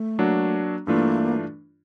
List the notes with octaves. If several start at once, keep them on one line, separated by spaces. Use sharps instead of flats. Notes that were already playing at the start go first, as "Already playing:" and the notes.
Already playing: A3
F#3 A#3 D4 F#4
G2 E3 A3 A#3 D4 F4